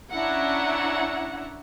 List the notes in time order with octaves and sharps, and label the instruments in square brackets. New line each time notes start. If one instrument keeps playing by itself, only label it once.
[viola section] C#4 D4 E4 E5 F#5 A#5